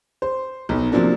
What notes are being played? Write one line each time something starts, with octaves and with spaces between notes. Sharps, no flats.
C5
B1 D#4
C3 F3 F#3 A#3 D4